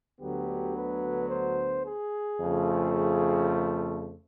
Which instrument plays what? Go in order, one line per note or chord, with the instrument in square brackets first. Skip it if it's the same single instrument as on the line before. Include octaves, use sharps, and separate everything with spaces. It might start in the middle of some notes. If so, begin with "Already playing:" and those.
[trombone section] D2 D3 F#3 B3 G4
B4
C5
G#4
F2 C#3 F3 A3
G#4